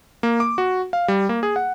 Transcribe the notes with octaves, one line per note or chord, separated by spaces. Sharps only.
A#3
D6
F#4
F5
G3
A#3
G#4
F#5